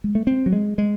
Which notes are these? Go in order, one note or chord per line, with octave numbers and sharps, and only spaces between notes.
G#3
A3
C4
F#3
G#3
G#3